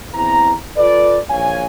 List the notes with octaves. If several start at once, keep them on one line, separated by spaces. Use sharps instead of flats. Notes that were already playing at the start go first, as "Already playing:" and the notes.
E2 E3 C4 A#5
F4 A4 B4 D5
A#1 C#5 F5 G#5